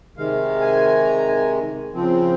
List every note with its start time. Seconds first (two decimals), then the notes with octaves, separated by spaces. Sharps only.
0.17 C3 D#3 G#3 F5
0.61 G#5
1.05 A#5
1.28 G#5
1.94 C#3 F3 C4